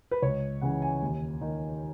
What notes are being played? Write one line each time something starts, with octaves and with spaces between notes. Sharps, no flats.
B4
C#2 C#5
C#3 E3 F#5
G#5
D#2
D#3